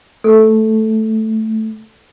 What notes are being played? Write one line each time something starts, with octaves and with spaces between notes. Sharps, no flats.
A3 A4